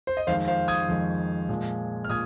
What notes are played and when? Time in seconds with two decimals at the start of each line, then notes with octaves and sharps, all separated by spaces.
0.07 C5
0.17 D#5
0.27 F2 D#3 G#3 C5 F5
0.48 C5 F5
0.68 D#6 G#6
0.88 F2 D#3 G#3
1.49 A#2 F3 G#3
2.05 F6
2.09 A#2 D#6 G#6